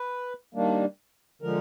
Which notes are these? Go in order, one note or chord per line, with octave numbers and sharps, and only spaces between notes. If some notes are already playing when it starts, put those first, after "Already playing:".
Already playing: B4
D#3 G3 A#3 D4
D3 F3 G#3 A#4